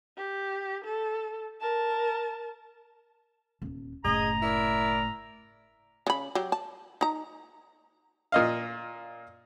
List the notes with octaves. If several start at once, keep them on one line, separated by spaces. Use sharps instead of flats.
G4
A4
A#4 A5
D#1 E2
F#1 A2 G#4 D#5 A#5
E4 A#4 D5
C#3 B5
F#3 G4
A5
D#4 A#5
A#2 D#5 F5